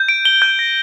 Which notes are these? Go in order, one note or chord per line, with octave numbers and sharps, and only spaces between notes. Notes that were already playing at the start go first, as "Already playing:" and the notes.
Already playing: G6
D7
G7
G6
A#6